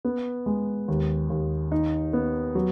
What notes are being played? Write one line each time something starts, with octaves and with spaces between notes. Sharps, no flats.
B3
G#3
D#2
D#2
D#4
B3
F#3